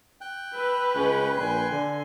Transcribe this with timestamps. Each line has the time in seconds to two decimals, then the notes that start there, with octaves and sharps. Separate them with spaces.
0.21 G5 F#6
0.54 B4 E6
0.94 C#2 G#3 C#4
1.36 A#1 G#5 C6
1.71 D3